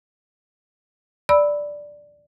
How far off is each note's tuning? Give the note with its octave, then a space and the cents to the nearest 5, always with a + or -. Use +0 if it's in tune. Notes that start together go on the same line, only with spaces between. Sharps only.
D5 +0 B5 +0 E6 -10